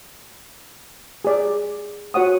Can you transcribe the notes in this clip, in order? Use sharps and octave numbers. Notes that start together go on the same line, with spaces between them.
G#4 D5
F#4 C#5 F#5 D#6